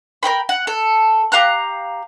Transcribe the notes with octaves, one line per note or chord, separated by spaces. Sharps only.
A#4 C5 G5 B5
F#5
A4
G4 F5 A#5 F#6